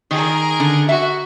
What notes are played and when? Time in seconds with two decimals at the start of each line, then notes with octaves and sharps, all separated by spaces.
0.11 D#3 G#4 A#4
0.60 D3
0.89 F#4 E5